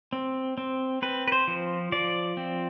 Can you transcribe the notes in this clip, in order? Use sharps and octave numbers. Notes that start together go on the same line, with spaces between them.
C4
C4
C4 B4
B4
C5
F3
F3 D5
C4